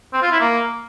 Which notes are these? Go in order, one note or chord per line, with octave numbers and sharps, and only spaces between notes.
C4
F4
E4
A#3